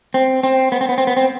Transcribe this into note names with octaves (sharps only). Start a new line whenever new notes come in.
C4
C4
B3
C4
B3
C4
B3
C4